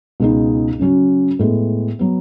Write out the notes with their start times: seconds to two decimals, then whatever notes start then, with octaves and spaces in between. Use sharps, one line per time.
0.20 C#2 B2 G#3 D#4
0.79 C#3 F#3 C#4 F#4
1.39 A2 G#3 B3
1.99 F#3 B3